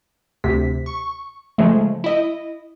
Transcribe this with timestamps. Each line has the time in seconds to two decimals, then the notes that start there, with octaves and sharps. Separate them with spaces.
0.44 D2 C3 B6
0.86 C#6
1.58 C#3 F3 G#3 A3
2.04 E4 D#5